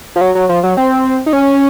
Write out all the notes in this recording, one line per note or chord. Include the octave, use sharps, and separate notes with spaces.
F3
F#3
F#3
F3
F#3
C4
D#4
C#4